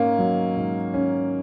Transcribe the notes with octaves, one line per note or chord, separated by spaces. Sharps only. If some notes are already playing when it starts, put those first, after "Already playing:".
Already playing: G#2 A#3 C#4
F#3
G#2
C#4